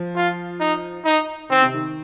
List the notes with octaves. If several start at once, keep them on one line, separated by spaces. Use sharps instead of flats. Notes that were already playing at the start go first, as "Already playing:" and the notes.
Already playing: F3
F4
D#4
D#4
D#3 C4
C3
D#3